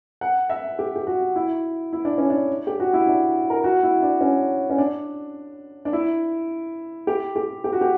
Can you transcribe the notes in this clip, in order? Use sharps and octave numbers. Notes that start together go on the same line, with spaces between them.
F#5
E5
G4
G4
F#4
E4
E4
D4
C#4
D4
G4
F#4
E4
D4
A#4
F#4
E4
D4
C#4
C#4
D4
D4
E4
G4
G4
G4
F#4
G4